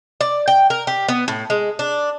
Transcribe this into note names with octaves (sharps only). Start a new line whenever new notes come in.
D5
G5
A#4
G4
B3
A2
G#3
D4